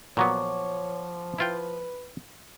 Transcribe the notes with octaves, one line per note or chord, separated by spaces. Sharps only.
A#2 F3 F#3 B3 C#5 F#5 C#6 D6
E4 F4 B4 G5